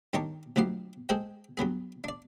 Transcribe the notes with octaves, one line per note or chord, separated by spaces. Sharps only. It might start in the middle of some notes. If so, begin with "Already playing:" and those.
G2 D#3 D#4 G4 C#5 A5
D2 B2 F3 F#3 G4 C6
G#3 G#4 A4 C5 G5
G2 F#3 B3 G#4
D4 D5